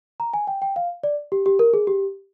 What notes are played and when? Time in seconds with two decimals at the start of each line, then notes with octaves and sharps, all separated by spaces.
0.20 A#5
0.34 G#5
0.47 G5
0.62 G5
0.76 F5
1.04 D5
1.32 G4
1.46 G4
1.59 A#4
1.74 G#4
1.87 G4